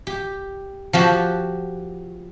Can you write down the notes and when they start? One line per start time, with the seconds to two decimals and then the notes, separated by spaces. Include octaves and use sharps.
0.07 G4
0.93 F3 F#4 G4